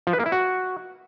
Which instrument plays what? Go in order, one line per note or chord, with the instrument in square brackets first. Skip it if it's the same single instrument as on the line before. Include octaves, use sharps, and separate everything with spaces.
[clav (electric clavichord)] F3
B4
A#3
E4
F#4